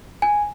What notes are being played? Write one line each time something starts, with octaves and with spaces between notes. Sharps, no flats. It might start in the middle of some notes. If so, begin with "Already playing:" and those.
G#5